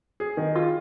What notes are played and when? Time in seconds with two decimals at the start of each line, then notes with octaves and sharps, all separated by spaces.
0.20 G#4
0.37 D#3
0.55 F4